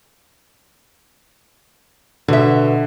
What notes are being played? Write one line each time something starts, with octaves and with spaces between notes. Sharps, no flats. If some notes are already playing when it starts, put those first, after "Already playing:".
B2 D3 E5